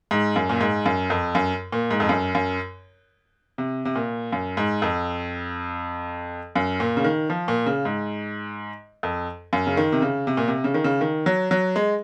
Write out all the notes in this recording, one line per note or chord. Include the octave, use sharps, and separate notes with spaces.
G#2
F#2
A#2
G#2
F#2
F2
F#2
A#2
G#2
F2
F#2
F#2
C3
C3
A#2
F#2
G#2
F2
F#2
A#2
C#3
D#3
F3
A#2
C#3
G#2
F2
F#2
C#3
D#3
C3
C#3
C3
A#2
C3
C#3
D#3
C#3
D#3
F#3
F#3
G#3